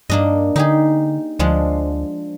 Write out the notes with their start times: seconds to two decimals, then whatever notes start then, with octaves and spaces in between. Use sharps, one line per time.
0.10 G2 A#3 D4 D#5
0.56 D3 D#4 G4 G#4
1.39 D2 F3 G#3 D4